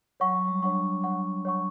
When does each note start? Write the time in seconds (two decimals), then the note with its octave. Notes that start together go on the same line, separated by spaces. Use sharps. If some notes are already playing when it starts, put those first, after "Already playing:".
0.20 F#3 C#5 F#5 C#6
0.34 F#3
0.48 G3
0.63 D4 C#5 F#5 C#6
1.04 C#5 F#5 C#6
1.45 C#5 F#5 C#6